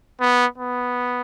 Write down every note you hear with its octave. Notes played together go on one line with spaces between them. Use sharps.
B3
B3